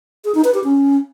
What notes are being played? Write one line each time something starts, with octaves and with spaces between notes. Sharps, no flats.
G#4
D#4
B4
G4
C#4